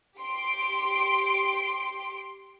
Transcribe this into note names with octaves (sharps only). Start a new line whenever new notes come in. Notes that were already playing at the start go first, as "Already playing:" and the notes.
G4 C6 D7